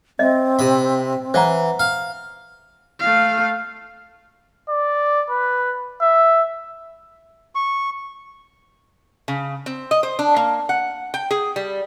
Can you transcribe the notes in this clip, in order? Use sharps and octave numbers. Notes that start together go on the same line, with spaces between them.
C4 D#5 E5
C3 B5
E3 C5 F#5 A#5
F5
A3 F5
D5
B4
E5
C#6
C#3
C4
D#5
C5
D4
A#3
F#5
G5
G#4
G3